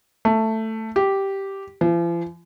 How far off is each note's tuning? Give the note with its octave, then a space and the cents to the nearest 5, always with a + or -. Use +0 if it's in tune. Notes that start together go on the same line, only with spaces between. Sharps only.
A3 +10
G4 -5
F3 -45